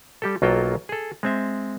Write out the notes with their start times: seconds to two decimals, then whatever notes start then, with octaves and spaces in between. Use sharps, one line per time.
0.22 G3 G4 A4
0.42 B1 F#3 A#3 F4 A4 G5
0.89 G#4 A4
1.23 G#3 C4 E5